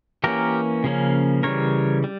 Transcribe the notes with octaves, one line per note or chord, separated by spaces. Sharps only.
E3 A#3 C#4 G4 A#4
C#3 F3 A#3 C#4
C#3 E3 G3 A#4 C#5
G3